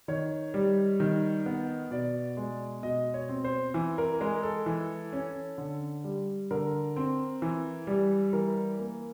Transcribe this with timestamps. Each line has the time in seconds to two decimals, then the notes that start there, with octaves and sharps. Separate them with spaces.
0.08 D#3 C#5
0.54 G3
1.00 D#3
1.46 B3
1.91 B2 D5
2.37 G#3
2.83 B2 D#5
3.14 C#5
3.29 C4
3.44 C5
3.74 E3
3.98 A#4
4.21 G#3 A#4
4.43 A4
4.66 E3
5.12 C#4
5.58 D3
6.04 G3
6.51 D3 A#4
6.96 C4
7.42 E3
7.87 G3
8.33 E3 A#4
8.79 A#3